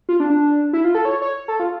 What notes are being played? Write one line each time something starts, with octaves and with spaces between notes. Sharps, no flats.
F4
D4
D4
E4
F4
A4
C#5
C#5
A4
F4